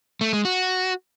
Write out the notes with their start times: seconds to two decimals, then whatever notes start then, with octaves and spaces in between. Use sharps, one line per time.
0.21 A3
0.33 G#3
0.45 F#4